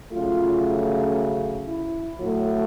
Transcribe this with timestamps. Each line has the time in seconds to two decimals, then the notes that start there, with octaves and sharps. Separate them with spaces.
0.12 C#3 F#3 A3 F4
1.68 E4
2.19 A2 F#3 A3